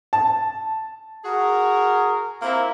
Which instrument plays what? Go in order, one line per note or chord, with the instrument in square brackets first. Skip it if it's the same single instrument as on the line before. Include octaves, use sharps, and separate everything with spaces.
[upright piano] A5
[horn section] F#4 G#4 A#4
A#3 C4 E4